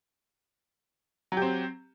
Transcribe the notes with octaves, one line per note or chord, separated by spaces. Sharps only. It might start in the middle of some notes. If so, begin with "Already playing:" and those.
F#3 C4 G4